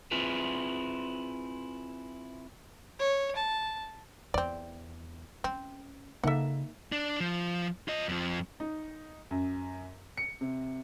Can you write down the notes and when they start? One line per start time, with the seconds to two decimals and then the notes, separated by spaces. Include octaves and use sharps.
0.11 C4 E4 F4 G#4 B4 C5
2.99 C#5
3.36 A5
4.34 E2 C4 D5
5.44 C4 C#4
6.24 C#3 A#3 D#4 A4 E5 F#5
6.92 D4
7.20 F3
7.88 F4 D#5
8.09 F2 F3
8.60 D#4
9.31 F#2
10.17 C#7
10.41 C3